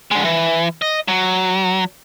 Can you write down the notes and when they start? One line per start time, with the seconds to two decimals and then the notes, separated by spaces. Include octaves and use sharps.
0.11 D3 G#3
0.25 E3
0.82 D#5
1.08 F#3